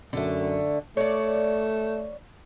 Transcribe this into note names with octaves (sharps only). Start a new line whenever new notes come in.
F#2 D3 A3
A3 C#5 D5